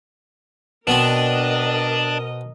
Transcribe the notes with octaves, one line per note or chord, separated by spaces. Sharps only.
B2 B3 C4 D4 A#4 D#5